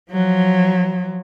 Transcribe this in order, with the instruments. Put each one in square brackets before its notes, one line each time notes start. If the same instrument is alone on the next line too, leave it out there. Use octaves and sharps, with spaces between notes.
[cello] F3 F#3